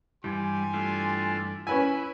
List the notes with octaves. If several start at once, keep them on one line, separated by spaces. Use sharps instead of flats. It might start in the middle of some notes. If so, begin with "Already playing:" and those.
G2 E3 G3 G4 G#5 C6
A3 D4 F4
C#4 E4 B4 G#5